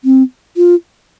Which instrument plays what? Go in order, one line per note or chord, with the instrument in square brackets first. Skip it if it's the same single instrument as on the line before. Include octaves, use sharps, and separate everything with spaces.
[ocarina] C4
F4